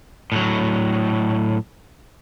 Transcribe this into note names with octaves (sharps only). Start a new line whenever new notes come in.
A2 F#3